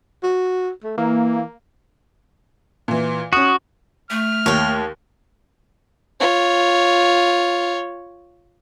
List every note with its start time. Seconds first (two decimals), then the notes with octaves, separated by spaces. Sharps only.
0.23 F#4
0.84 A3
0.98 E3 A#3
2.88 A#2 E3
3.33 C#4 F#4 D#6
4.11 A3 F6
4.46 D#2 C#5 G5
6.20 F4 C#5